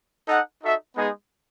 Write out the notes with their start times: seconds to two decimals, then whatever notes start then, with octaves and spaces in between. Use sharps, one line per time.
0.26 D#4 A4 D#5 F#5
0.61 D#4 F#4 A4 E5
0.96 G#3 B3 D#4 G#4